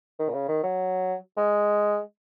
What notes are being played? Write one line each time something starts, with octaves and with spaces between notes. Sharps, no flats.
D#3
A#2
C#3
D#3
F#3
G#3